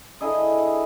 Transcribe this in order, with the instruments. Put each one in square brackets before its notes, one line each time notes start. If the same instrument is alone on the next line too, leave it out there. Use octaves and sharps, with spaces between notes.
[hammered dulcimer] D3 E4 G#4 D#5